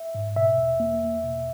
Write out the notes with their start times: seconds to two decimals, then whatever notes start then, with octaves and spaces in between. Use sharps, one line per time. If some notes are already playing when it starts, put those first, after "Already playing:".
Already playing: E5
0.15 G#2
0.36 B2 E5
0.58 E2
0.80 A#3
1.02 E2
1.24 B2